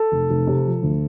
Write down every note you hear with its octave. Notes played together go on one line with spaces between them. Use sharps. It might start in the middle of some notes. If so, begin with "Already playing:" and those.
Already playing: A4
F1
F1
C3
F3
D2